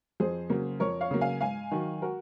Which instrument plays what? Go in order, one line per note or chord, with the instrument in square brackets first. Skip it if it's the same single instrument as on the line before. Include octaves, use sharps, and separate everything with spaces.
[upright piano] F2 G#4 C5
C#3 F#3 A#3
F2 A#4 C#5
C#5 F5
C#3 F#3 A#3
F5 G#5
G#2 F5 G#5
D#3 F#3
F#4 A#4